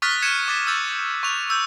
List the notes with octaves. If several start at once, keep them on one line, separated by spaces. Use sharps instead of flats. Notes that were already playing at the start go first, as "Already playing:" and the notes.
C#6 D#6 F6 F#6 A6 B6
F#6 G#6 C#7 D#7 E7
D6 A6 B6
E6 G6 A6
C#6 F#6 F7
E6 G6